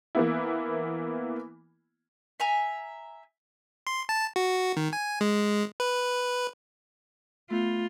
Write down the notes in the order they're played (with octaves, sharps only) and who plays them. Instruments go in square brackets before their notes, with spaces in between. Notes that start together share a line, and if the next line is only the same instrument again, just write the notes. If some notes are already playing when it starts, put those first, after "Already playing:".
[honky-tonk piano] E3 A#3 B3 E4
[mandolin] E5 G#5 A#5
[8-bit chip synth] C6
A5
F#4
D#3
G#5
G#3
B4
[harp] A3 B3 G6 [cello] F4